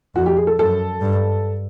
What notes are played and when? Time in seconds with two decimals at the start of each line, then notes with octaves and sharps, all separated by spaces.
0.15 F2 F#4
0.26 G4
0.37 G#4
0.47 A4
0.59 F#2 A4
1.01 G2